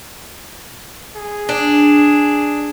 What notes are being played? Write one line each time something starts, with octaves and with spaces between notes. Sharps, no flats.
G#4
D4